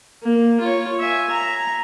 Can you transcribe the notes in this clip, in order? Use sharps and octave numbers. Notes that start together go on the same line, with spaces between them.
A#3
F4 C#5
E5 G#5
A#5